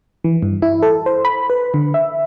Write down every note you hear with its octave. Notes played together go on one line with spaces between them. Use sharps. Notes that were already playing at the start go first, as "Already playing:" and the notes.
E3
G2
E4
A4
C5
B5
B4
D3
E5